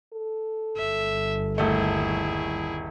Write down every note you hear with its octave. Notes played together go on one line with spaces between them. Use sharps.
A4
G1 E5
D#1 A3 E4 G#4